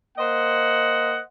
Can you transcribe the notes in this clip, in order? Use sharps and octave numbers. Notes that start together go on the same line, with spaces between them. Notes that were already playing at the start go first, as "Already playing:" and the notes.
A#3 C5 D#5 F#5